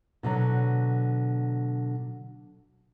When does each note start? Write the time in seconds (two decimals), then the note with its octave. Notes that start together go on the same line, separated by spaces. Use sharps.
0.23 B2 D3 F#3